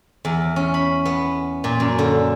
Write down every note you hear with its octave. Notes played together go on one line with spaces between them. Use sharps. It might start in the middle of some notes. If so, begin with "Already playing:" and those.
E2
C#4
B5
B3
A#2
F#2
D3